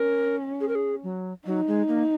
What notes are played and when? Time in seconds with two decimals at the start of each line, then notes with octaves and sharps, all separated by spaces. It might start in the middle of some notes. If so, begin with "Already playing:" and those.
Already playing: C#4 A#4
0.61 G#4
0.68 A#4
0.75 G#4
1.03 F#3
1.46 F#3 D#4
1.67 G#3
1.88 A#3